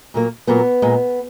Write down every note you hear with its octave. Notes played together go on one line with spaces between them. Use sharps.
A#2 F#3 A#3
A#2 F#3 A#3 B3
A#2 G#3